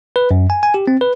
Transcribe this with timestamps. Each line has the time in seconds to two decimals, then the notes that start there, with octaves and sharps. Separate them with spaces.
0.16 B4
0.31 F#2
0.50 G#5
0.63 G#5
0.74 G4
0.87 C4
1.01 B4